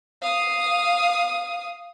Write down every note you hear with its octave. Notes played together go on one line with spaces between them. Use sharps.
F5 D#6